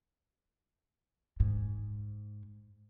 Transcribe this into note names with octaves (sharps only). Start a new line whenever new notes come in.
G#2